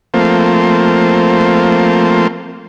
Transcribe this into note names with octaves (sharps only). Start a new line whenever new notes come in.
F3 A3 A#3 C4